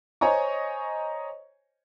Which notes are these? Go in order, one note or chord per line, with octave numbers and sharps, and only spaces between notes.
C5 C#5 D#5 G#5 A#5 C#6